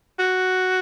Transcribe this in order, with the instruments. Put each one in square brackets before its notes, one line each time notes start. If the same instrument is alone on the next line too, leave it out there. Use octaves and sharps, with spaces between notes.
[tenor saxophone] F#4